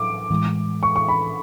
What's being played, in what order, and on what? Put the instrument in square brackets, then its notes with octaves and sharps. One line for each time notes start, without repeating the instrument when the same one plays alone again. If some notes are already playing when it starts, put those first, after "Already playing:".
Already playing: [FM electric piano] A2 F#3 [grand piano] D6
[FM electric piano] A2 E3 G#3
[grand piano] C#6
C#6
B5